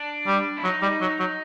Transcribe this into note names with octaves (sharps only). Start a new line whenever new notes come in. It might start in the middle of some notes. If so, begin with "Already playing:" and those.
Already playing: D4
G3
E4
F#3 D#4
G3
F#3
F#3